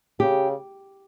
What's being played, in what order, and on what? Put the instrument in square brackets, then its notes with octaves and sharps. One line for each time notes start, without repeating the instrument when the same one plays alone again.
[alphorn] C#3 [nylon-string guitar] G4